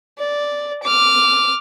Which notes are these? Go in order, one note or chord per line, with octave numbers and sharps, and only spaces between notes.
D5
D6 F6